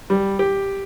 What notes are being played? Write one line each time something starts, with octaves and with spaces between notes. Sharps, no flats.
G3
G4